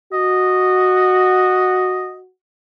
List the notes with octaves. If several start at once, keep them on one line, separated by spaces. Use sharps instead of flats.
F#4 D#5